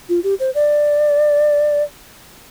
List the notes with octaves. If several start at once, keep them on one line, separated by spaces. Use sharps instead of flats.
F4
G4
C5
D5